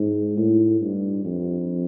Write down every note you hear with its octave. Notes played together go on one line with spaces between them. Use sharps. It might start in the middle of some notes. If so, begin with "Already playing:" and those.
Already playing: G#2
A2
G2
F2